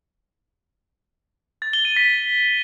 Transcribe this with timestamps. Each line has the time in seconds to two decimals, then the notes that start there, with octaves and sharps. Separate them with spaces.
1.62 A6
1.73 G7
1.85 D#7
1.96 B6